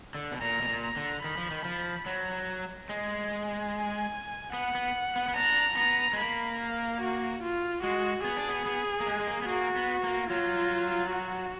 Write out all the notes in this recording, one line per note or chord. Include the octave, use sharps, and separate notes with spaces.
D3
B2
A#2 A#5
B2
A#2
A#5
D3
D#3 B5
F3
D#3
F3
F#3
G#3
G#5
B3 F#5
B3
B3
B3
D4 A#5
B3 A#5
G#3
A#3 B5
F5
F#4
F4
G#3 F#4
B3 G#4
D4
B3
B3
A#3
G#3
G#3
A#3
B3
A#3 F#4
B3
A#3
F#3 F4
F#4